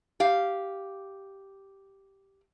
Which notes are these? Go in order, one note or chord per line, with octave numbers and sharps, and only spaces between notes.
G4 F5